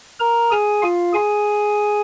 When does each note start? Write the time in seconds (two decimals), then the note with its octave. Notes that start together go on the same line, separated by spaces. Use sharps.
0.20 A#4 A#5
0.51 G#4 G#5
0.82 F4 F5
1.13 G#4 G#5